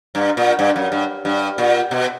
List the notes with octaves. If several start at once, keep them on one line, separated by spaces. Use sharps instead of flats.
G2
A#2
G2
F#2
G2
G2
A#2
B2